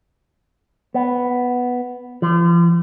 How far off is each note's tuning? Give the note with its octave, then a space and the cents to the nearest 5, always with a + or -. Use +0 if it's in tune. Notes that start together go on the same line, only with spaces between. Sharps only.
B3 +0
F3 -40